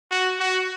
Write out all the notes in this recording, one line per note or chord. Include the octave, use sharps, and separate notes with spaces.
F#4
F#4